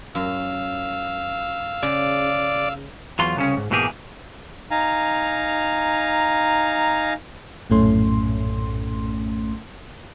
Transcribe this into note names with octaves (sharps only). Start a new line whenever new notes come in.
F#2 F5 E6
C#3 D5
E2 F#3 F4 C6
C2 C#3 C#4
G#2
G#2 B2 E3 A#3 G4 G#4
D#4 F5 G#5 A#5
A#1 F#2 A2 A3 C#4 C6